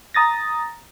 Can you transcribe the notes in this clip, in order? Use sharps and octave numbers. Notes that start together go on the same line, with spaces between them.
A#5 D#6 A6 A#6